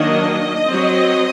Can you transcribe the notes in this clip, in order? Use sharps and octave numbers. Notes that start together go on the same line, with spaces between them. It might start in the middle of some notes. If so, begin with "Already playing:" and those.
Already playing: D#3 F#3 A#3 D4 D#5
F#3 C4